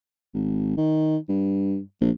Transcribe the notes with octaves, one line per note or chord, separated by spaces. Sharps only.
G#1
D#3
G2
A#1